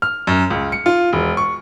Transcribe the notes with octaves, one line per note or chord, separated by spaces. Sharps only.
F6
F#2
C#2
C#7
F4
E1
C#6